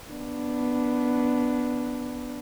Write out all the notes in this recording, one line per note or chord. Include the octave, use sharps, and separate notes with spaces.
B3 D4